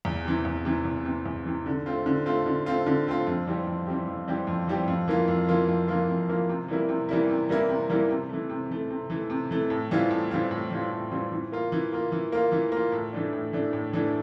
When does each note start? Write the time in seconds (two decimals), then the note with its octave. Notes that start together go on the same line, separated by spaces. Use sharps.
0.05 E2
0.25 C3 E3
0.45 E2
0.65 C3 E3
0.85 E2
1.05 C3 E3
1.26 E2
1.46 C3 E3
1.66 D3
1.86 A3 C4 F4
2.06 D3
2.26 A3 C4 F4
2.46 D3
2.66 A3 C4 F4
2.86 D3
3.07 A3 C4 F4
3.27 F2
3.47 E3 G3 C4 G4
3.67 F2
3.87 E3 G3 C4 G4
4.07 F2
4.28 E3 G3 C4 G4
4.47 F2
4.68 E3 G3 C4 G4
4.88 F2
5.08 E3 A#3 F4
5.28 F2
5.48 E3 A#3 F4
5.68 F2
5.88 E3 A#3 F4
6.09 F2
6.29 E3 A#3 F4
6.49 C3
6.68 E3 G3 A#3 E4
6.89 C3
7.09 E3 G3 A#3 E4
7.29 C3
7.49 E3 G3 A#3 E4
7.69 C3
7.89 E3 G3 A#3 E4
8.09 C3
8.29 E3 A3
8.50 C3
8.70 E3 A3
8.91 C3
9.10 E3 A3
9.30 C3
9.51 E3 A3
9.70 A2
9.91 E3 G3 C4 F4
10.11 A2
10.31 E3 G3 C4 F4
10.51 A2
10.71 E3 G3 C4 F4
10.91 A2
11.11 E3 G3 C4 F4
11.32 E3
11.52 A#3 F4
11.72 E3
11.93 A#3 F4
12.12 E3
12.32 A#3 F4
12.52 E3
12.72 A#3 F4
12.92 A2
13.13 E3 A3 D4
13.33 A2
13.53 E3 A3 D4
13.73 A2
13.93 E3 A3 D4